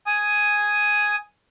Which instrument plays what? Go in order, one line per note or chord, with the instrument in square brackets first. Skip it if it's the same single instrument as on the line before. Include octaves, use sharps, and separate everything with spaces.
[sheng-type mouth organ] G#5 D#6